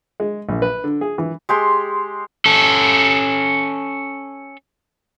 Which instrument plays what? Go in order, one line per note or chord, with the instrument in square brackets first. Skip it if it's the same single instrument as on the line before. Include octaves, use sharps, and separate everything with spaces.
[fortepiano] G#3
A#1
B4
D3
G#4
E3
[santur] G#3 G4 C6
[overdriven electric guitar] C#4 A4